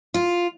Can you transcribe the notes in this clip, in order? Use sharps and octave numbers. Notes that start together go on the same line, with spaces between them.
F4